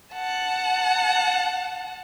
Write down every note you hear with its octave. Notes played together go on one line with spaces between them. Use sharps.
F#5 A5